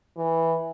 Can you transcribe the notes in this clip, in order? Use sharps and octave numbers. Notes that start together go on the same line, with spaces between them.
E3